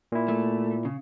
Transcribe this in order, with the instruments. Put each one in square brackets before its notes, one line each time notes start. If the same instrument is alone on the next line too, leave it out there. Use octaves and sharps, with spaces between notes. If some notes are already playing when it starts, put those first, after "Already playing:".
[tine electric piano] A#2 E4
[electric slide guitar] A3
C#3